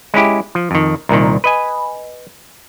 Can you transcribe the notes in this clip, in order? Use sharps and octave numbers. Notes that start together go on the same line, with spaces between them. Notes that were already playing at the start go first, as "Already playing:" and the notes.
G#3 C#4 E4 G4
F3
F2 D#3
C2 A#2 D#3
B4 D#5 G#5